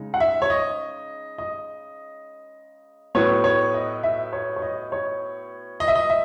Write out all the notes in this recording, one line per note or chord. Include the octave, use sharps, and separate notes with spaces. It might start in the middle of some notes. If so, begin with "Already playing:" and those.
Already playing: C#3 G#3 D#4
F#5
E5
C#5
D#5
D#5
A2 F#3 B3 C#5
C#5
D#5
E5
C#5
C#5
D#5
C#5
D#5
E5
D#5
E5